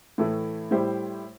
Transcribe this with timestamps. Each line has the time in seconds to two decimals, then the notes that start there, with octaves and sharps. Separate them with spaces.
0.18 A2 E3 A3 E4 A4
0.71 A2 G3 E4 G4 C5